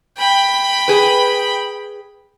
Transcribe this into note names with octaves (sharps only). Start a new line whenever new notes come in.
G5 B5
G#4 B4